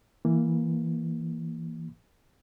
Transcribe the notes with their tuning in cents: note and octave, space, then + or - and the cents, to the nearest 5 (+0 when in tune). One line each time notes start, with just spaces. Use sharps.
E3 +0 A#3 +0